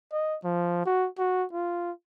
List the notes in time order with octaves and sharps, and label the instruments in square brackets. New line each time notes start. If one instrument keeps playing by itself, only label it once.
[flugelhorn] D#5
F3
F#4
F#4
F4